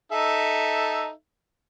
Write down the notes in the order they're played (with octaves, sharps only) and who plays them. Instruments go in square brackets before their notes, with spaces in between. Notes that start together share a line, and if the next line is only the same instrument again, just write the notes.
[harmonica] D#4 A4 E5